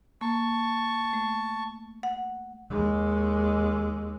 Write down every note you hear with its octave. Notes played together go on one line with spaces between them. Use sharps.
A#3 A5 C#6
A3
F#5
D#2 G#3